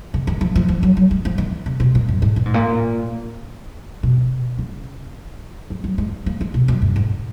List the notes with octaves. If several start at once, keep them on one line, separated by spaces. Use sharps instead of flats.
C#3
D#3
F3
F3
F3
F#3
F#3
G#3
F3
D#3
C#3
B2
A#2
F#2
G#2
A#2
G#2
A#2
B2
C#3
F3
F#3
G#3
A#3
G#3
B2
F#2
F#2
G#2